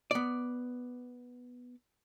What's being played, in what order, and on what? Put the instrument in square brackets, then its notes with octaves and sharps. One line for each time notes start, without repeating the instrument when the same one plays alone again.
[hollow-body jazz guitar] B3 D5